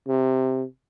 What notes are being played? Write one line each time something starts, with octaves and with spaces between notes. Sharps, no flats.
C3